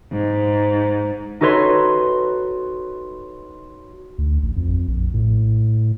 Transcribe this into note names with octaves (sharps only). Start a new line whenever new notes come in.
G#2
D#4 F#4 A4 B4 C#5 C6
D2
A1
F2
A#1
A2